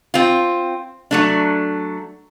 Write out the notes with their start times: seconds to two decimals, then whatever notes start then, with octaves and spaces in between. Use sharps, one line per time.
0.14 C4 F4
1.11 F#3 A3 D4